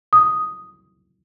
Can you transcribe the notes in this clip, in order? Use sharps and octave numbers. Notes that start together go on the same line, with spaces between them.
D#6